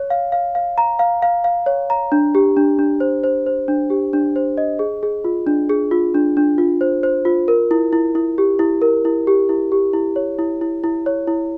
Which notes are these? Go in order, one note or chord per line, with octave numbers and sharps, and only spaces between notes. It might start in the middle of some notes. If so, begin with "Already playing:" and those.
Already playing: C#5
F5
F5
F5
A#5
F5
F5
F5
C#5
A#5
D4
G4
D4
D4
C5
C5
C5
D4
G4
D4
C5
D#5
G#4
G#4
F4
D4
G#4
F4
D4
D4
F4
C5
C5
F4
A#4
E4
E4
E4
G4
E4
A#4
E4
G4
E4
G4
E4
C#5
E4
E4
E4
C#5
E4